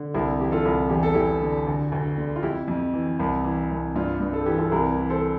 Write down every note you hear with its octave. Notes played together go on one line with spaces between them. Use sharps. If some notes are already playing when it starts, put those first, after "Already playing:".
Already playing: D3
C2 E4 G4
E3 G4
F4 A4
C2
E2 G4
A4
E2 E4 G4
D3
D2
D2
D3
F4
F2 E4 G4
F2
E3
C2
E3
C2
G2 F4
G2
A4
E3 G4
F4 A4
C2 G4 A#4
E3
A4 C5